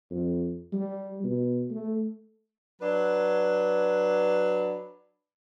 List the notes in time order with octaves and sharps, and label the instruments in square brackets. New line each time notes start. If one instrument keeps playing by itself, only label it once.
[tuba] F2
G3
B2
A3
[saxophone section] F#3 D4 B4